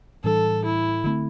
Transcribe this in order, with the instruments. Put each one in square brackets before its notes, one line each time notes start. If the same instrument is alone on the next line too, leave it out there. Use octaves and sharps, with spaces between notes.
[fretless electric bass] A2 E3 G3 D4 [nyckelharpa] A4
[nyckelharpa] E4
[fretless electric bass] D3 A3 C4